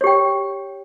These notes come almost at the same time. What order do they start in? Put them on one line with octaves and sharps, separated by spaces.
C#5 G4 G5